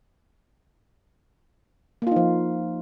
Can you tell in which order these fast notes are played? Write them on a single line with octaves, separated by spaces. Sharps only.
A#3 F4 D#4 F3